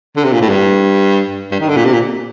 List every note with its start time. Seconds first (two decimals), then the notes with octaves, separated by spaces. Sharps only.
0.16 D3
0.24 C3
0.33 A#2
0.41 A2
0.49 G2
1.51 G2
1.60 D#3
1.69 D3
1.76 A#2
1.85 C3
1.93 A#2